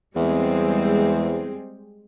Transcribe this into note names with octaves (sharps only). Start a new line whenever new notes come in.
E2 G3 G#3 C4